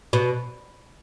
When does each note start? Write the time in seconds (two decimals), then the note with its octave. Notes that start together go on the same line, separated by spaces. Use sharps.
0.13 B2